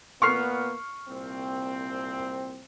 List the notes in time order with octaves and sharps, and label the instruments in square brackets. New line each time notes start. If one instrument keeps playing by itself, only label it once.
[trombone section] A#2 A#3 B3 [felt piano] C#6 F6 C7
[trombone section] C2 A#2 C4